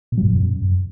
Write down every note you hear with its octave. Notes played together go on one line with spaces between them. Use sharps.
B2
F#3
G2
B2
F#2